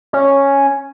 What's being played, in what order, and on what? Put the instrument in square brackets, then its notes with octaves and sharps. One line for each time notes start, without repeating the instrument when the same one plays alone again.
[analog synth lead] C#4